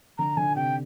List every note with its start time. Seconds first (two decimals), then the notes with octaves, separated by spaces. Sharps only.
0.18 D3 A#5
0.37 D3 G#5
0.56 C3 G5